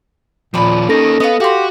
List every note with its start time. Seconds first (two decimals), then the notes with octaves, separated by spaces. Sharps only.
0.54 D#2 A#2 F3 D5 B5
0.89 A#3 C#4 D#4 A4 A#6
1.20 B3 D#5 F5
1.40 F#4 G4 F5 C6